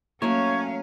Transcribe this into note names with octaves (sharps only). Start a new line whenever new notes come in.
F#3 A3 A#3 C#4 C#5 F5